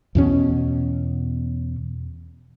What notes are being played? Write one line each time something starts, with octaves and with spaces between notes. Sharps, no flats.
E2 B2 C#4